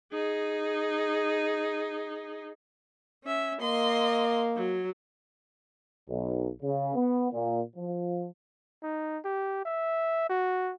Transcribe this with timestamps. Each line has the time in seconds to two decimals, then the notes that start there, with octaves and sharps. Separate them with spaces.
0.13 D#4 G#4
3.24 C#4 E5
3.61 A#3 D#5 C6
4.56 F#3
6.09 B1
6.62 C#3
6.95 B3
7.32 A#2
7.76 F3
8.83 D#4
9.24 G4
9.65 E5
10.30 F#4